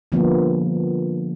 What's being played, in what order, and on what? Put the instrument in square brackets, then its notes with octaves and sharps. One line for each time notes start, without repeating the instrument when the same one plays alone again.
[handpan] D3 F3 G3 A#3 B3